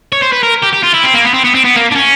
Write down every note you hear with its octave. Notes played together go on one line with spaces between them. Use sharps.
C#5
C5
B4
A#4
G4
G4
F4
E4
C4
A#3
B3
C4
B3
C4
B3
A#3
D4
C#4